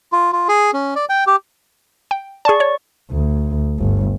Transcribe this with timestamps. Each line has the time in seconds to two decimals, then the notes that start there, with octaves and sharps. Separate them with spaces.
0.12 F4
0.33 F4
0.49 G#4
0.73 C#4
0.95 D5
1.09 G5
1.27 G4
2.11 G5
2.45 G#4 D5 A5 C#6
2.60 C#5
3.11 D2
3.79 G1